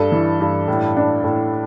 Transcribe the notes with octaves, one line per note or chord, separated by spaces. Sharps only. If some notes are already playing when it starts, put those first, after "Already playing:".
Already playing: G2 A4
E3
G2
A2
D4
A2